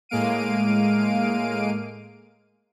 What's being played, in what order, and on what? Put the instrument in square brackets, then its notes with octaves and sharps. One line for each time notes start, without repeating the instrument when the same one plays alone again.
[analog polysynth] A2 G#3 A#3 F5 D7 D#7